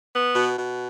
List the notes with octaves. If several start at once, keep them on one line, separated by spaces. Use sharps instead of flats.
B3
B2
B2